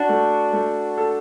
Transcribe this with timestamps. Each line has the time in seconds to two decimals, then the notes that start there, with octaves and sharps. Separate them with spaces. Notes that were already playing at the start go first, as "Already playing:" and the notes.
Already playing: D4 F#4
0.09 A3
0.53 A3
0.97 A4